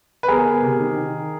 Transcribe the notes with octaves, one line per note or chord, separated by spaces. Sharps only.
B4
G1 G#4 A#4
G1
C3
D#3
D#3